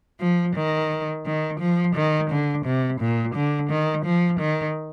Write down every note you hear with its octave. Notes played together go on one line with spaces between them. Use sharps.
F3
D#3
D#3
F3
D#3
D3
C3
A#2
D3
D#3
F3
D#3